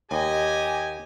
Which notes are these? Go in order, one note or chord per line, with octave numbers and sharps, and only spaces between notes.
D#2 G4 D#5 G#5